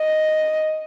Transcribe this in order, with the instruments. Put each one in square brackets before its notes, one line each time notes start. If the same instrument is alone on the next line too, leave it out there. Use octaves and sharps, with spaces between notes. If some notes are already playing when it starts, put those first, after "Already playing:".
Already playing: [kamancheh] D#5